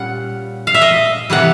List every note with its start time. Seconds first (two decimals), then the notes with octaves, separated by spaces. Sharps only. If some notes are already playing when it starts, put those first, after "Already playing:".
Already playing: A#2 G3 C#4 F4 F#5
0.67 F5
0.74 E5
0.82 D#5
1.30 C3 E3 G3 A#3 F#5